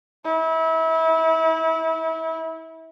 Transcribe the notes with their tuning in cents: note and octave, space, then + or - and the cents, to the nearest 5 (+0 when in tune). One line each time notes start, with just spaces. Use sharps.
E4 -30